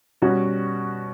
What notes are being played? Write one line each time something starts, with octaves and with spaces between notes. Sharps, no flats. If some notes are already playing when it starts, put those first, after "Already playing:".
B2 G3 C#4 F#4